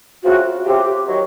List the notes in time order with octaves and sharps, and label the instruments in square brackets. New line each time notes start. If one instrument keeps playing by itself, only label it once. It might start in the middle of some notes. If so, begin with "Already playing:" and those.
[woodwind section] C#3 F3 A3 C4 F4 [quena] F#4
[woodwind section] C#3 F3 A3 C4 F4 [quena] G4
[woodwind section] D#3 F#3